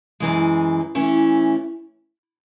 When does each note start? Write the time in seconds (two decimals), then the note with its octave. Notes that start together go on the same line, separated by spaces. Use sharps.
0.20 F#2 E3 G#3
0.95 E3 A3 C#4